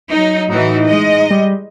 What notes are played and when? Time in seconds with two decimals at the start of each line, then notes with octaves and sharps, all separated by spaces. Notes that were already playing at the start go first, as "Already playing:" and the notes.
0.10 F#3 D#4
0.49 A2 E3 D#4 F#4
0.86 G#3 D#5
1.31 G3